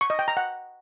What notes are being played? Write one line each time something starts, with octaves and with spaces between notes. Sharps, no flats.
C#6
D#5
G5
A#5
F#5